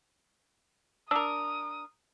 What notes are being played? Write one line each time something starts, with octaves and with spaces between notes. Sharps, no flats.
D4 A#4 D#6 E6